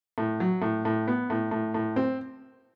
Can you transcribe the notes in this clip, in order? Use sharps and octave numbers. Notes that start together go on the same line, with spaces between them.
A2
F#3
A2
A2
B3
A2
A2
A2
C4